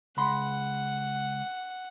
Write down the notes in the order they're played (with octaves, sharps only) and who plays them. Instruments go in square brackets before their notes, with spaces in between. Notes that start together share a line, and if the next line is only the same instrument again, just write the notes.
[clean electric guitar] C#2 B5 C6 [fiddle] F#5